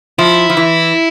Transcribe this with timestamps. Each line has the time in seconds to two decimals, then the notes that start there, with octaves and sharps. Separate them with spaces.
0.18 F3 E4
0.50 F3
0.57 E3